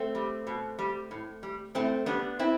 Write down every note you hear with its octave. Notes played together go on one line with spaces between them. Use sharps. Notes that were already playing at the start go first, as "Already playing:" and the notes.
Already playing: A3 C4
G3
B2
G3
A2
G3
A2 A3 C4
G3 B3 D4
C4 E4